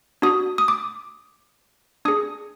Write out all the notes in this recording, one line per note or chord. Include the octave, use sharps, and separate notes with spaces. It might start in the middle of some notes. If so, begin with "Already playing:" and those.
D4 F#4 D#6
D#6
D6
D4 G#4 D#6